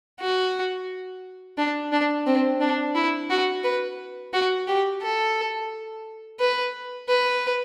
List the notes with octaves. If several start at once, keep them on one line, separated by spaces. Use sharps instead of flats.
F#4
D4
D4
C4
D4
E4
F#4
B4
F#4
G4
A4
B4
B4